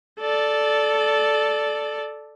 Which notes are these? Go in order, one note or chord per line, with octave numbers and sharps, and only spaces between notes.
A4 D5